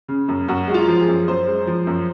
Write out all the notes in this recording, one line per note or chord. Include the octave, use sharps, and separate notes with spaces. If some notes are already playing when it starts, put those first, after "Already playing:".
C#3
F#2
F#2 F#4
G#3 F#4
F4
F3
G#4
F#2
F#2 C5
G#3
F3
F#2